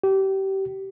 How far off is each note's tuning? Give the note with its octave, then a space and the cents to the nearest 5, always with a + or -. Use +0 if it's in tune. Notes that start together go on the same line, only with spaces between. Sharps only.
G4 -25